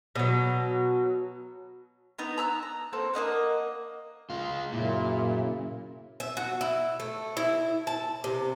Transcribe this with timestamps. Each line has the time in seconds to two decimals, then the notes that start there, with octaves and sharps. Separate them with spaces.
0.15 B2 F#3
2.19 B3 D#4 A#5
2.38 A#5 E6 F#6
2.63 A#5
2.93 A#3 C4 A4
3.14 A#3 C#4 D#5 F#5
4.30 G#3 F4
4.72 F#2 A#2 C#3 E4
6.20 E5
6.37 F#4
6.61 E4
7.00 A3
7.37 E4
7.87 A5
8.24 C3